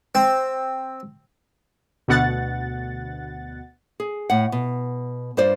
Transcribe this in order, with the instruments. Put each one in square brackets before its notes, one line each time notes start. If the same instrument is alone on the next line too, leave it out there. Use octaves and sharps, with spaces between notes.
[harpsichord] C4
[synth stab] D2 B2 F#5 A6
[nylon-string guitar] G#4
A2 F#5
B2
G2 F4 C5 D5